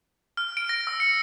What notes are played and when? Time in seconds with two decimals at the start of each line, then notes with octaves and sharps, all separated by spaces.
0.37 F6
0.57 D7
0.69 A#6
0.87 E6
1.00 C#7